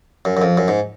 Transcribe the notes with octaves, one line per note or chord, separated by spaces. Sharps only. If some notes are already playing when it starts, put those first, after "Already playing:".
F#2
F#2
F2
F#2
G#2